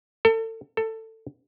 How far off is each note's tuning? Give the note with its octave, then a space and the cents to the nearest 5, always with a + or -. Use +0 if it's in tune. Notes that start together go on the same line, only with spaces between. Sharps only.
A4 +35
A4 +20